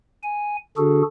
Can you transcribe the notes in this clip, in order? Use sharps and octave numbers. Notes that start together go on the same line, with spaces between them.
G#5
D3 D4 F#4 G#4 A4